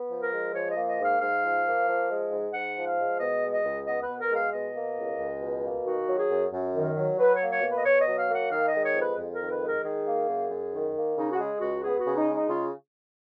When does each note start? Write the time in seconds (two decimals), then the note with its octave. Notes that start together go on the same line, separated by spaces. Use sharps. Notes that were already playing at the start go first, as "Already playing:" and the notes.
Already playing: B3
0.11 F3
0.21 A#4
0.33 G#3
0.55 F3 C#5
0.71 D#5
0.76 A#3
0.87 D#5
0.99 G#2
1.05 F5
1.21 G#2 F5
1.43 F3
1.65 A#3
1.87 F3
2.10 G#3
2.31 G#2
2.54 G#2 F#5
2.77 F3
2.87 F5
2.98 G#3
3.20 B2 D#5
3.43 G#3
3.53 D#5
3.65 C#2
3.87 B3 D#5
4.03 B4
4.09 B2
4.20 A#4
4.31 G#3
4.36 F5
4.53 B2 D#5
4.75 A#3
4.97 C#2
5.19 C#2
5.41 B2
5.64 A#3
5.86 D#3 F#4
6.08 F#3
6.19 G#4
6.30 F#2
6.52 F#2
6.75 D#3
6.97 F#3
7.18 F#3 B4
7.36 C#5
7.41 A#3
7.52 C#5
7.63 B2
7.68 B4
7.78 D#5
7.85 B2 C#5
8.01 D#5
8.07 F#3
8.18 F5
8.29 A#3
8.34 F#5
8.51 D#3 F5
8.68 D#5
8.74 G#3
8.85 C#5
8.95 F2
9.02 B4
9.18 F2
9.34 A#4
9.40 D#3
9.51 B4
9.61 G#3
9.68 A#4
9.84 D#3 G#4
10.06 A#3
10.28 F#2
10.50 F#2
10.73 D#3
10.95 A#3
11.17 C#3 D#4
11.32 F#4
11.39 G#3 G#4
11.60 C#2 F#4
11.84 B3 G#4
12.00 F#4
12.05 C#3
12.16 D#4
12.28 G#3
12.34 D#4
12.49 C#3 F4